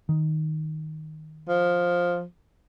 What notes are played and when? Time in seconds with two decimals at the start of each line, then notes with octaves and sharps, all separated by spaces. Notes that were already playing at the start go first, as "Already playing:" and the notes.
0.09 D#3
1.48 F3